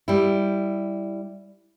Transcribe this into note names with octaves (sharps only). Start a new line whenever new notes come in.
G3 E4